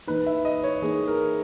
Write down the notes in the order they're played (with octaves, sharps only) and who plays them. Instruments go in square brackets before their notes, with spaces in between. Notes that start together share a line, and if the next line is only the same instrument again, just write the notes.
[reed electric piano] E3 A#3 D#4 [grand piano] B4
[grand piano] E5
D#5
C#5
[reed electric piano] E3 A#3 D#4 [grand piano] G#4
[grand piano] A#4